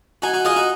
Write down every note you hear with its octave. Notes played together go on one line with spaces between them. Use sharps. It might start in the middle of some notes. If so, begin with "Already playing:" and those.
D#4 F#4 G#5
D#4 F#4
F4 G#4 D#5
D#4 F#4